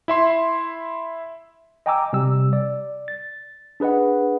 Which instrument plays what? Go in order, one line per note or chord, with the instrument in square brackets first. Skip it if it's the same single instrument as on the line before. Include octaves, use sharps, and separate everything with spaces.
[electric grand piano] E4 E5 C6
[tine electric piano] D#5 G5 G#5 A#5 D6 E6
C3 G3 G4 E6
D5
A6
D4 G#4 B4 D#5 F#5